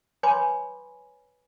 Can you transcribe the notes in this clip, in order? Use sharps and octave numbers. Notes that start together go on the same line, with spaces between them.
B4 C#5 G#5 B5 C6 D6